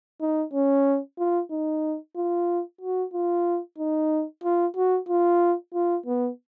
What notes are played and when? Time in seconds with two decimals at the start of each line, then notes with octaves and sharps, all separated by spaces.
0.21 D#4
0.54 C#4
1.19 F4
1.51 D#4
2.16 F4
2.81 F#4
3.14 F4
3.79 D#4
4.44 F4
4.76 F#4
5.09 F4
5.74 F4
6.06 B3